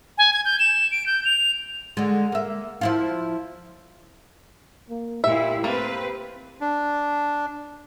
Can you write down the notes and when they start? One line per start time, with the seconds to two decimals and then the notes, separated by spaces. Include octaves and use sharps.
0.18 G#5
0.33 G#6
0.45 G6
0.59 E7
0.91 D7
1.06 G6
1.25 F7
1.97 D3 G#3
2.32 A#3 E5
2.81 F3 E4 F4
4.90 A#3
5.24 A#2 E4 G4 E5
5.64 A3 A#3 C4 B4
6.61 D4